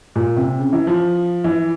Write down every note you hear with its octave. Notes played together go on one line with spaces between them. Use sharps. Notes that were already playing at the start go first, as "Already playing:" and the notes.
A#2
C3
C#3
E3
F3
E3